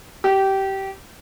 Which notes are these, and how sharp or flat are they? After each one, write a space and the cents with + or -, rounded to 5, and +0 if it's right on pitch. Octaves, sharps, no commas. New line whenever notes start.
G4 -20